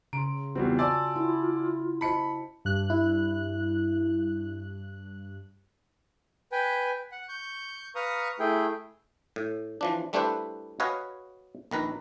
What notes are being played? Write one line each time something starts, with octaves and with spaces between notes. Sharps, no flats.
C#3 A#5 C6 D7
E2 G3 C4 F4 F#4
D5 F#5 G#5 A5 C6 E6
E4
C5 D#5 A5 B5 C#7
G2 F#6
E4
B4 G5 G#5
F#5
C#6 G6
B4 F5 A#5 C#6 D#6
A3 E4 G#4 G5
A2
E3 F3 D4
G3 A3 D4 E4 B4 C5
F#4 B4 C#5 D#5 F5 G#5
A#1 D#3 B4 A#5